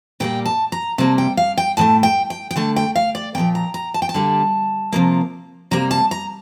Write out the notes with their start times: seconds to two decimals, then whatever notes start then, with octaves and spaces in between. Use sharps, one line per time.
0.20 A#2 G3 A#3 G5
0.45 A5
0.72 A#5
0.98 C3 G3 A#3 A5
1.18 G5
1.37 F5
1.58 G5
1.77 A2 F3 A3 A5
2.03 G5
2.30 G5
2.51 G5
2.56 D3 A3 A5
2.76 G5
2.96 F5
3.15 D5
3.35 A#2 F3 A#3 G5
3.55 A#5
3.74 A#5
3.94 A5
4.02 G5
4.09 A5
4.14 D3 G3 A#3
4.93 C3 F3 A#3
5.71 C3 G3 A#3 A#5
5.91 A5
6.11 A#5